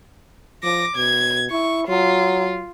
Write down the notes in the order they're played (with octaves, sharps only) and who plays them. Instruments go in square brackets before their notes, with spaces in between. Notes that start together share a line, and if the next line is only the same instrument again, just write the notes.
[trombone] F3 [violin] D6 A#6
[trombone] B2 [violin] G#6
[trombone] E4 [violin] C#6
[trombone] F#3 [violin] F4